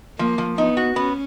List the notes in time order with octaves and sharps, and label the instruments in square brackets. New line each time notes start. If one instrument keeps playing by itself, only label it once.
[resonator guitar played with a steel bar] F3 [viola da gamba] A#3
[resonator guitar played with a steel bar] F3
[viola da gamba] B3 [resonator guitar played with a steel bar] D#4
[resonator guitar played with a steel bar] F#4
[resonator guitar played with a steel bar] B3 [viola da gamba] C#4